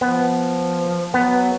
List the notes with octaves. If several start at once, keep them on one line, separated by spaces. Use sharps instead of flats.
F3 B3
F#3 B3